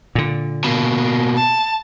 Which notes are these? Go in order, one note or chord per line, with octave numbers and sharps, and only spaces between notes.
A#2 D3
B2 A#3
A5